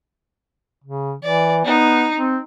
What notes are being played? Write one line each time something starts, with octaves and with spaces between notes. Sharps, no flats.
C#3
E3 D5
B3 D#4
C4